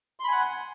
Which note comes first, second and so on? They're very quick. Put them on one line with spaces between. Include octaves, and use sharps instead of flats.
C6 B5 G#5 F#5